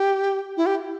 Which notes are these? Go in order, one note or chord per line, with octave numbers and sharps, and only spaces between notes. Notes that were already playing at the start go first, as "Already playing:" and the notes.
Already playing: G4
E4
G4